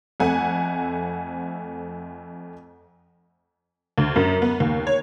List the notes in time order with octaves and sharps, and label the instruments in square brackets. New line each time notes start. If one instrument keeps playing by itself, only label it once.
[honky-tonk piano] F2 A3 C4 F#5 G#5
D2
F#2
B3
D#2
C#5